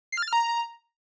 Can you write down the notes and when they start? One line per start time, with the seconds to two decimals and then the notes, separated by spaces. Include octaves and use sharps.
0.12 C7
0.17 F6
0.22 A6
0.28 F6
0.33 A#5